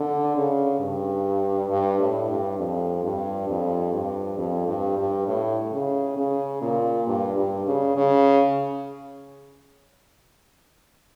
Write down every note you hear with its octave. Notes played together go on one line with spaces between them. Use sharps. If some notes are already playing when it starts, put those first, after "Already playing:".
Already playing: D3
C#3
G2
G2
A2
G2
F2
G2
F2
G2
F2
G2
G2
A2
C#3
C#3
A#2
G2
G2
C#3
C#3